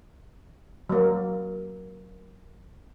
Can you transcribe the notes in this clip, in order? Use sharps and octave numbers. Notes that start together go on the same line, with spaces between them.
F#3 A#3